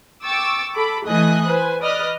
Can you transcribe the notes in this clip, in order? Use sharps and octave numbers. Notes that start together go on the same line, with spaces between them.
G5 C#6 D6 E6 A6
A4 B5 D6
E3 A3 D#5 G#5 D#6 F#6
B4 C5 G#5
B4 D5 D#5 D#6 F6 F#6